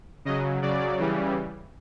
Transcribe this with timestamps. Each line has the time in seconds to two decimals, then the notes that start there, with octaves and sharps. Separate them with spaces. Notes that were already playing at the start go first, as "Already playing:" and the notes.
0.25 C#3 F#3 D#5
0.62 C#3 F#3 D5
0.98 C#3 E3 G3